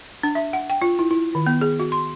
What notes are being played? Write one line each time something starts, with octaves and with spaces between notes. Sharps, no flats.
D4
E5
F#5
G5
F4
E4
E4
D#3
B3
G#4
F#4
C6